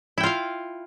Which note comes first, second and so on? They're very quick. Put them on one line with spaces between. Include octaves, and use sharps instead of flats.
E4 G5 F4 F5